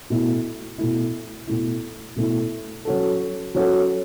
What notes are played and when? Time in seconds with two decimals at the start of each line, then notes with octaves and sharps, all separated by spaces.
0.10 B2 A3 E4
0.78 B2 A3 E4
1.47 B2 A3 E4
2.16 B2 A3 E4
2.85 F#3 C#4 F#4 A4
3.55 F#3 C#4 F#4 A4